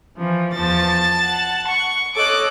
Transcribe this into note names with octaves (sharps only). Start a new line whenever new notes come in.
E3 F3
E2 F3 A5 A6
F#5
C#6
A4 C#5 D#5 D6 F#6